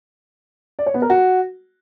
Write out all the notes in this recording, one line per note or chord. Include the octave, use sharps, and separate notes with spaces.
D5
C#5
B3
A#4
F#4